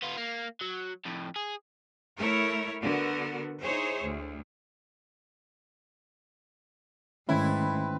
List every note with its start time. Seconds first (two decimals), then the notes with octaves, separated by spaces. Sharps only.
0.02 B3 F4
0.17 A#3
0.61 F#3
1.05 F2 A2
1.36 G#4
2.19 A3 E4 A#4 C#5
2.82 D3 B3 F#4 A#4
3.62 D#4 E4 G#4 C5 C#5
4.02 D2
7.29 G#2 D#3 A3 C4 C#4 E4 B4